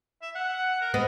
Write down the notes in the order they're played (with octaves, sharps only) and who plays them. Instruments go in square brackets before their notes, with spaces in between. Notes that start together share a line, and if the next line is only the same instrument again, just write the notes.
[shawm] E5
F#5
A#4
[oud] B3 [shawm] D#5